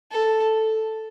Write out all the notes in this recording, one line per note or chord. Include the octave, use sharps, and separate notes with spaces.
A4